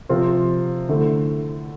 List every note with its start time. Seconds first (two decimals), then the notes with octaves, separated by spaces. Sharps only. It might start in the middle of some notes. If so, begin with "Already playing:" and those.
0.09 C3 F3 C4 F4
0.89 D3 A3 E4